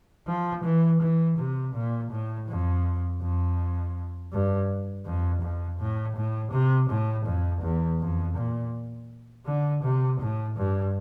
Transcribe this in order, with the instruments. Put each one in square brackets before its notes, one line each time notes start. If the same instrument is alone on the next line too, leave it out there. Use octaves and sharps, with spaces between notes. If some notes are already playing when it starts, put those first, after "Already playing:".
[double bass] F3
E3
E3
C3
A#2
A2
F2
F2
G2
F2
F2
A2
A2
C3
A2
F2
E2
F2
A#2
D3
C3
A2
G2